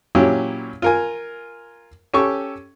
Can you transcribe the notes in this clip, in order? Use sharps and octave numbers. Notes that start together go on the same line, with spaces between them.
A#2 F#3 C#4 E4 G4
F4 A#4 G#5
C#4 G4 A4 C#6